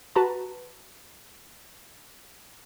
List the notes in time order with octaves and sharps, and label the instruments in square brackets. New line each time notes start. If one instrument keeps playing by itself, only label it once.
[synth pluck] F#4 B4 A5 A#5